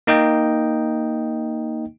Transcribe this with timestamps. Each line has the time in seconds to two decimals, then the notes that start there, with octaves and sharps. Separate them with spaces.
0.07 A#3 D#4 D#5 G5